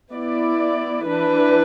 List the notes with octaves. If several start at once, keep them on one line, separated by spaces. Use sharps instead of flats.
B3 E4 D5
E3 D4 B4